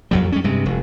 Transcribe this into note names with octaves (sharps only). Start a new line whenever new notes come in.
F2 F#3 G3
G3 C#4
G2 C3 G#3
F1